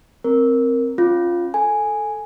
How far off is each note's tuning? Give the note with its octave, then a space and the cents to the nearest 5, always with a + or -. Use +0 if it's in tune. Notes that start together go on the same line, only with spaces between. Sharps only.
C4 +5 A#4 +0
C#4 -25 F4 +0
A4 +0 G#5 +0